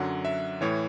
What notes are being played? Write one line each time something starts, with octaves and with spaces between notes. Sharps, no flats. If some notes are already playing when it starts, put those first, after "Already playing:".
Already playing: F#2 D3 F#3 F#5
E5
A2 E3 C#5